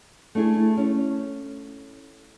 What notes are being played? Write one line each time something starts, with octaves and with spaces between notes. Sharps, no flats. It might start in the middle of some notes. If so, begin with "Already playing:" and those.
A3 D4 E4 G#4
C#4